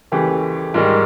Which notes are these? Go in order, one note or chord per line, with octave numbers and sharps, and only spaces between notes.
D#2 C#3 E3 A3 G4
G#2 D#3 G3